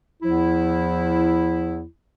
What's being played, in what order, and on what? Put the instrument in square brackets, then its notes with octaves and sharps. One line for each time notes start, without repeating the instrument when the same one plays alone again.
[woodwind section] E2 F3 E4